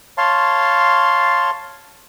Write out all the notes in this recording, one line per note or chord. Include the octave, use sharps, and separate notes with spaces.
C#5 F5 A5 C6